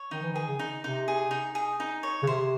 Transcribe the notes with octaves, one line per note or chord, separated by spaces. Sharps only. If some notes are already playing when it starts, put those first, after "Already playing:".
Already playing: C#5
D#3 D#4
E3
D#3
G#4
C#3
D#4
C3 D#4
G#4
D#4
G#4
D#4
C#5
C#3
C3 C5